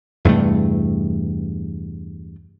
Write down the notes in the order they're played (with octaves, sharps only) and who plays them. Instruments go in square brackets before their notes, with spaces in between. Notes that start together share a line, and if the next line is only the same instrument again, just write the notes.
[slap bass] E2 G2 C3 A3